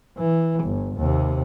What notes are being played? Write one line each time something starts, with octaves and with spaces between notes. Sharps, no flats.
E3
G1
D#2 C3